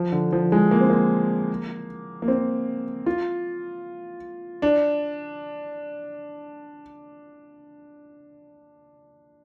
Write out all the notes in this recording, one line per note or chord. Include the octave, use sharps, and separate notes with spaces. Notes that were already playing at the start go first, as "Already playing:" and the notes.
Already playing: F3
D3
F3
G#3
A#3
C4
A#3
A#3
C4
F4
D4